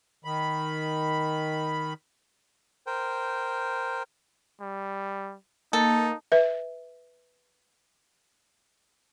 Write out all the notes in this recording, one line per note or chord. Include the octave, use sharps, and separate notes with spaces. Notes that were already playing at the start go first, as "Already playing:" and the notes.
D#3 B5
A#4 C5 G5
G3
A#3 D#4 A4
B4 E5